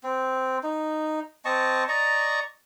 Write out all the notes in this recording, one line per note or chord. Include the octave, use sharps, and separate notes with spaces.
C4
D#4
C4 D#5 A5 C#6
D5 D#5 A#5 C#6